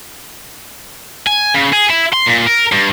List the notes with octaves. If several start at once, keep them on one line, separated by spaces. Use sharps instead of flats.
G#5
C#3
G#4
E4
C6
A#2
A#4
G2